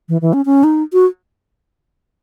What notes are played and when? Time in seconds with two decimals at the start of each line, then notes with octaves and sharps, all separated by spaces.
0.09 E3
0.21 E3
0.33 C#4
0.46 C#4
0.64 D#4
0.93 F#4